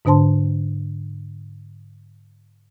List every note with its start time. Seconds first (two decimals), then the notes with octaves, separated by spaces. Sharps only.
0.05 G#2 D3 D4 C5 A5 C6